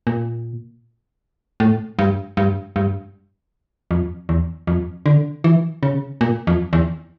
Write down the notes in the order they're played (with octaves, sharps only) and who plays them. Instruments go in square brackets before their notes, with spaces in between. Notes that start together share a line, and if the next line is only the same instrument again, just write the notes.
[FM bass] A#2
A2
G2
G2
G2
F2
E2
F2
D3
E3
C#3
A#2
F2
E2